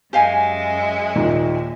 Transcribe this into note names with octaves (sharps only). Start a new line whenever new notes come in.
F#2 G#3 G4 E5 F5 G#5
D#2 A#2 D#4